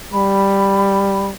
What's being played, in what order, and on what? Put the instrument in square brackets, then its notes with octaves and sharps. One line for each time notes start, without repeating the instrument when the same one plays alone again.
[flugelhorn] G3 [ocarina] B5